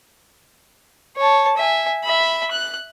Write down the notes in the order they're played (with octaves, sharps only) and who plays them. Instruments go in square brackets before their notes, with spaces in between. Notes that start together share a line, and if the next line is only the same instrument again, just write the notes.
[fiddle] C#5 A5
E5 G#5
E5 B5
F#6